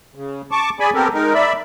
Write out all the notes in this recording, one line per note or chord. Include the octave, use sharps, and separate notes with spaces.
C#3
A5 C#6 D6
G#4 D5 G#5 B5
B3 C4 G4 A4 A#4
G#3 D#4 A#4
D5 E5 B5